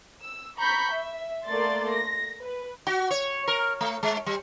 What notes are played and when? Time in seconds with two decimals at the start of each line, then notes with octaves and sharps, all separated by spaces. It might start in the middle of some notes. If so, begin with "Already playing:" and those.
0.21 E6
0.57 A#5 B5 C#6 G6 B6
0.91 E5
1.46 A3 A#3 D5 C6 A6
1.92 A#6
2.41 B4
2.87 F#4
3.11 C#5
3.48 A#4
3.81 A3
4.03 G#3
4.26 G3